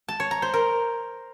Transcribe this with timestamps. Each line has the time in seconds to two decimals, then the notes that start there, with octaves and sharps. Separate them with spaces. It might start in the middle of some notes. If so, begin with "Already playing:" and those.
0.08 A5
0.20 C#5
0.31 A#5
0.42 C5
0.54 A#4